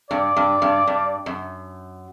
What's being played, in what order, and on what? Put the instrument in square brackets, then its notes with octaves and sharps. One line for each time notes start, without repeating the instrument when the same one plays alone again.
[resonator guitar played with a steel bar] G2 [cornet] D5
[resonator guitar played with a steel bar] G2
G2
G2
F#2